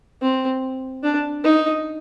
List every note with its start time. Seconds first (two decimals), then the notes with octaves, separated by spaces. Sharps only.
0.22 C4
1.03 D4
1.44 D#4